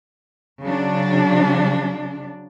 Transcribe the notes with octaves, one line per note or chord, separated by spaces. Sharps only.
C#3 F#3 D4